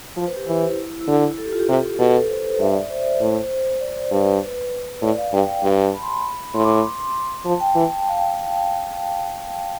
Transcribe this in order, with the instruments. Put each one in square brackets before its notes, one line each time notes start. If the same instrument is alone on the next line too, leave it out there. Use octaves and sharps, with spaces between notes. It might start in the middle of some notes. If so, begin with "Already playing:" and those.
[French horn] F3 [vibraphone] C5
[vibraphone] B4
G4
[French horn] E3 [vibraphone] E4
[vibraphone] E4
E4
[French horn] D3
[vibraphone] A4
G4
F4
G4
[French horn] C3
[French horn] B2 [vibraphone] A4
[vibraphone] B4
C5
[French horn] G2 [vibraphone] E5
[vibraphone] D5
C5
[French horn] A2 [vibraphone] C5
[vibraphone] C5
D5
[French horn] G2
[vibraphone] B4
B4
[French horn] A2 [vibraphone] D5
[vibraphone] F5
[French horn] G2 [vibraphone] G5
[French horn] G2 [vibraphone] A5
[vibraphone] B5
C6
B5
[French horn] A2 [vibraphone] C6
[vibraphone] D6
D6
C6
[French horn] F3 [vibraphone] A5
[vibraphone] G5
[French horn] E3 [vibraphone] A5
[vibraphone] F5
G5